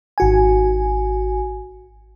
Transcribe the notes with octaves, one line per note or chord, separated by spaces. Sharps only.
G#1 F#4 G#5